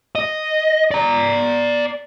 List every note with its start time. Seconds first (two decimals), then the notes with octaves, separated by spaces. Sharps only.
0.15 D#5
0.91 D5 A#5